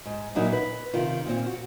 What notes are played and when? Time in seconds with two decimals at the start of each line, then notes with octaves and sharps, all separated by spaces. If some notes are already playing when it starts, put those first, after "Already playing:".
0.05 G#2
0.35 A#2 E3 F#3 A#3 D#4 E4
0.53 B4
0.94 C3 D#3 F4
1.26 A#2 C4
1.46 F#4